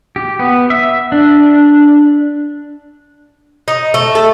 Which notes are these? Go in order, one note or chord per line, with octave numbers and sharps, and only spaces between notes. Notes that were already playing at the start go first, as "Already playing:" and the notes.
G4
B3
E5
D4
D#4
A3
A4